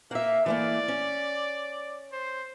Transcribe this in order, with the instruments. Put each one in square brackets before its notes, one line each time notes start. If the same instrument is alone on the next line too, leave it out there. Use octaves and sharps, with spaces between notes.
[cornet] A#3 [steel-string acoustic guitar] E5 F#5
[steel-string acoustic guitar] E3 A3 A#3 [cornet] D5
[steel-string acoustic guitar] C#4
[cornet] C5